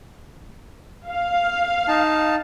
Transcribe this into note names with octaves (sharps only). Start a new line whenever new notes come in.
F5
D#4 A5